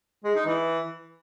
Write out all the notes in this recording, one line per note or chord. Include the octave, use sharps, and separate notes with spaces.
G#3
D#4
E3